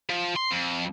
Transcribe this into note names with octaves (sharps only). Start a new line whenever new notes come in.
F3
C6
F2